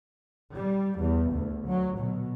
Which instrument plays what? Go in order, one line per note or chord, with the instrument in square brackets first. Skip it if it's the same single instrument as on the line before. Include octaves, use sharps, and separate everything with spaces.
[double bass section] G3
E2
D2
F#3
B2